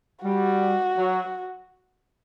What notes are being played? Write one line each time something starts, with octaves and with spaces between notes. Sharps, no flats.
G3 F#4
F#3